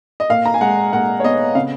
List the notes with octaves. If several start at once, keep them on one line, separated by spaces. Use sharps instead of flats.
D#5
A#2 F5
A#5
G#5
G#3 F#5
A#2 F#5
C#5
B3 D#5
C#3 F5